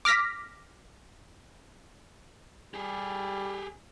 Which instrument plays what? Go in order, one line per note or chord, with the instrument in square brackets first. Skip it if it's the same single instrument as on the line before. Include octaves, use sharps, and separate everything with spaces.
[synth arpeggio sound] D6 F6 A#6 B6
[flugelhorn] G3 [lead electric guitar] G4 G#4